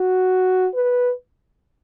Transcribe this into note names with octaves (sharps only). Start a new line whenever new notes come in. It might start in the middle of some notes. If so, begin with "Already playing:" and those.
Already playing: F#4
B4